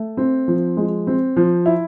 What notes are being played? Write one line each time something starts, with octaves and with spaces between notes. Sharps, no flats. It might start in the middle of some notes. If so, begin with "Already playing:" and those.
Already playing: A3
C4
F3
G#3
C4
F3
E4